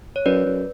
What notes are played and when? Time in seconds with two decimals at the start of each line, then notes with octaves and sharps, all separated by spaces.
0.16 C#5
0.25 F#2 B4 D5
0.45 F#2